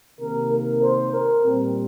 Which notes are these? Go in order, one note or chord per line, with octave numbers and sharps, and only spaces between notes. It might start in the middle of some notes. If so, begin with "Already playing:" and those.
C3 D#3 A#3 A#4
A#4
C5
A#4
A#2 G3 C4